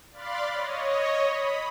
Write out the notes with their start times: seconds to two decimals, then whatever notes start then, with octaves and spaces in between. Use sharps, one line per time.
0.12 D5 F5 B5 C6 F#6 A6
0.50 C#5 D#5
1.23 B5 D#6